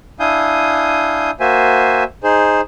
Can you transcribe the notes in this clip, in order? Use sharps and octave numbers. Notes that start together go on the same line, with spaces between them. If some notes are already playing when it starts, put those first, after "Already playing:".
D4 E4 F5 G#5 D#6 G6
A#3 F#4 C5 E5 G#5
D#4 G#4 C5